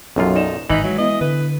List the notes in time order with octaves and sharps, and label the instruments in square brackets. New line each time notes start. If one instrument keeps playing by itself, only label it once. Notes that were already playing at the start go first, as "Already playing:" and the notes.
[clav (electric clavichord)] B1 F#2 F4 [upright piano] F#3 C#4
[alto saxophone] D#4 [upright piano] D5 E7
[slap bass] G#1 [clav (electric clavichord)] E3 [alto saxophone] D#4 [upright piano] B6 F#7
[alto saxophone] F#3 [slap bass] G#3
[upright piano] B3 E4 [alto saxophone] D#5
[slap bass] D3 [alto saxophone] B4